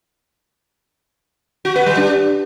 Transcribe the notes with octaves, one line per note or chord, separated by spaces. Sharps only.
F#4
B4
G3
D4